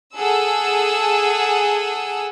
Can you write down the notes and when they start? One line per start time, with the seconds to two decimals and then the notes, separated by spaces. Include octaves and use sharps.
0.17 G#4 A4 F#5 E6